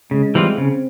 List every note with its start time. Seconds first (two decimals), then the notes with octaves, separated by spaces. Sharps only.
0.11 C#3 G#3
0.35 E3 G3 C4 F4
0.57 C#3 C4